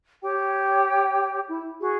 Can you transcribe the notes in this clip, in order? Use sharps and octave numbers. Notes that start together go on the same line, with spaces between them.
G4 C#5 G5
E4
F#4 G#4